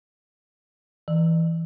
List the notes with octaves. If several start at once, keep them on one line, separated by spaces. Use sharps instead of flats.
E3